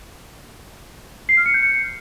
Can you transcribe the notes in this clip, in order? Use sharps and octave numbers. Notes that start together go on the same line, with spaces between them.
C7
F6
C#7
G6
C#7